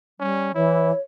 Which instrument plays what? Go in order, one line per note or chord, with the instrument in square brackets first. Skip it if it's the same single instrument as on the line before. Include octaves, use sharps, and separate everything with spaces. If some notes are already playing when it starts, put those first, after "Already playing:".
[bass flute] G3 [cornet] C#4
[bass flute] E3 [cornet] E4 [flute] C#5